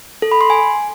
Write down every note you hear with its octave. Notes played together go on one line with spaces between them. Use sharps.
A4
B5
C6
G#5